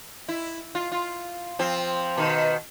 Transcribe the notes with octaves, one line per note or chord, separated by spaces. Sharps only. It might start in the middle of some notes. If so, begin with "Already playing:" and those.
E4
F4
F4
F3 C4
B2 D#3